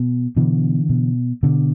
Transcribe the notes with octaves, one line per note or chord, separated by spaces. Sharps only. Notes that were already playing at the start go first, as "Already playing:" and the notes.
Already playing: B2
B2 D3 E3
B2
B2 D3